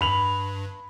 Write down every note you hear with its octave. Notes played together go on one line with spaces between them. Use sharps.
G2 B5 F7 F#7